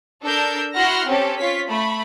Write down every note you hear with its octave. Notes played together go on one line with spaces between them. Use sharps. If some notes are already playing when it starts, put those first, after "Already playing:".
D4 A4 A#4 E6 G6
E4 F#4 F#5 C6 F6 A#6
C4 C#4 G4 A4
F4 C#5 B6
A3 B5